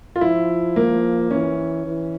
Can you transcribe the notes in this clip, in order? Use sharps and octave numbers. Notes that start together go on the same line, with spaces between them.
F4
F3 E4
A#3
E3 C#4
E3